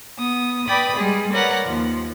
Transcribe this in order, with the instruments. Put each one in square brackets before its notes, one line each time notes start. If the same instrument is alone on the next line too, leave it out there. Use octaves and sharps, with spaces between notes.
[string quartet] B3 D#6
B4 D5 G5 B5 D#6
G3 G#3 G#4
A#4 B4 C#5 D5 F#5 A#5
D#2 F3